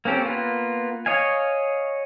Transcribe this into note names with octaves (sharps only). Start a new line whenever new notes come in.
A#3 C4 C#4 G4 A4
A#3 B3 F4
C#5 D#5 F5 G#5